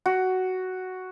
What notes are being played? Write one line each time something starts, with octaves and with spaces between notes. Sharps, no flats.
F#4